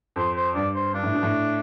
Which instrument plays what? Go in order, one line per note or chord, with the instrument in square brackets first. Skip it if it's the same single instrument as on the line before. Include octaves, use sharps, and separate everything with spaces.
[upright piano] F2 [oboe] C5
[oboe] C5
[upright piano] G2 [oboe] D5
[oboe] C5
[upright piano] G2 [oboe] D4
[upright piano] A2
B2
A2